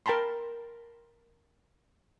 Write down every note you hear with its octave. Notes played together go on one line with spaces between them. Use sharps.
A#4 G5 A5 B5 C6